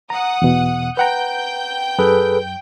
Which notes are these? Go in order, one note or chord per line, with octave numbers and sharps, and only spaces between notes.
F#5 A#5 D#6
E2 B2
B4 F#5 G5 A#5 G6
F#2 G#4 A4 B4